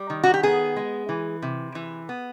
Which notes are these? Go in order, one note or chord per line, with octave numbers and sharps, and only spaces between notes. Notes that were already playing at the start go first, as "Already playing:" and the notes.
Already playing: G3
D#3
F#4
G4
B3 G#4
G#3
E3
C3
E3
B3